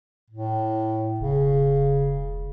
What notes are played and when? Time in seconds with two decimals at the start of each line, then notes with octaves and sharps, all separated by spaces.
0.30 A2
1.20 E1 C#3